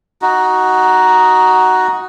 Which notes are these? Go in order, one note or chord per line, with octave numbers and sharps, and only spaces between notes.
D#4 F#4